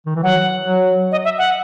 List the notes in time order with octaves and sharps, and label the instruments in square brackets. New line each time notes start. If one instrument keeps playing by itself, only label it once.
[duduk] D#3
E3
[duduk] F#3 [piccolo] F#5
[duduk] F#3
[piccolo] D#5
E5
F#5